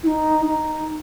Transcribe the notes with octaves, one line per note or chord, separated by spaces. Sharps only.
E4
D#4
D#4